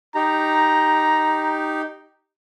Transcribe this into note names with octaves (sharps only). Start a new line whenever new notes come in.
D#4 G4 A#5